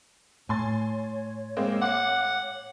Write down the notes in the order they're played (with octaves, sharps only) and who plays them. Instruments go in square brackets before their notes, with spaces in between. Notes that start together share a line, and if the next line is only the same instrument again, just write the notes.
[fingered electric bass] A2 [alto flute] C#5 [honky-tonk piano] G#5 C6 A6
[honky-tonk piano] G#3 A#3 C4
[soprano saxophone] F#5 [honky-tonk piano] D6